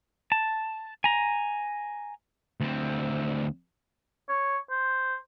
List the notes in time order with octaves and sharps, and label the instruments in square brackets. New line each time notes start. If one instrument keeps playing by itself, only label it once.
[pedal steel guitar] A5
G#5 A#5
[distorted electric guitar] D2 C4
[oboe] C#5
C5